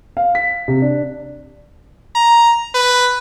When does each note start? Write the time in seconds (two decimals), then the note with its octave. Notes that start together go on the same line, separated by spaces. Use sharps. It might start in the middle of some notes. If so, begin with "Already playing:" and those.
0.17 F5
0.35 B6
0.68 C3
0.82 D4
2.15 A#5
2.74 B4